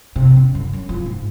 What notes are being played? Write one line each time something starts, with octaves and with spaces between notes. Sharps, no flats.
C3
C#3
F#2
F#2
F3
G#2